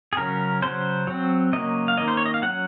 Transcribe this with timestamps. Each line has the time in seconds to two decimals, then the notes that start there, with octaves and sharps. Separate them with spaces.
0.13 G#4
0.17 C#3 F#3 C#4 A#4
0.62 C#3 F#3 C#4 C5
1.07 F#3 C4
1.53 C#3 F#3 A#3 C#4 D#5
1.88 F5
1.97 D#3 A#3 C#4 D#5
2.08 C5
2.17 C#5
2.26 D#5
2.34 F5
2.42 F#3 C#4 F#5